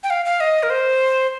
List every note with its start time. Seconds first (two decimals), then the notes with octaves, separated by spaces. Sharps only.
0.03 G5
0.10 F5
0.25 F5
0.40 D#5
0.63 A#4
0.70 C5